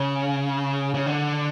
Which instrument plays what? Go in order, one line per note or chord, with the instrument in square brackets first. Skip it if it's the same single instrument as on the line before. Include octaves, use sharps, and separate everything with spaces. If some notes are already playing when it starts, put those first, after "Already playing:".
Already playing: [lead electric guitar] C#3
C#3
D3